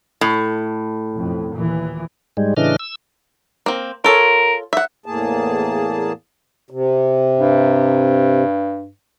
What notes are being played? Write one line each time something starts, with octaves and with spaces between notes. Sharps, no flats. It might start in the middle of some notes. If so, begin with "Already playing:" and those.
A2
B1 F2
D#2 A#2 E3
G#2 G3 G#3
A2 C#3 E3 D4 D#5 F6
E6
A#3 C4
F4 A4 A#4 C#5
E5 F#5
E2 A2 A#3 G#4 A5
C3
G2